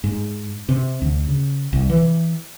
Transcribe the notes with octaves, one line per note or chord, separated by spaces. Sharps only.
G#2
C3
D2
C#3
C2
E3